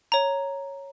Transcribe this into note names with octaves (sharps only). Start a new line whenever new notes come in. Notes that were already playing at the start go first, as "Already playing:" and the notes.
C#5 A#5